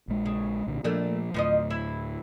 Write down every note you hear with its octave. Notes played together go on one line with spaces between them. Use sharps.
A#1 G#3
C#3
B1 A#2 D3
A#2 F3 A3 A#3 D4
D2 A2 F3 B4 D#5
E4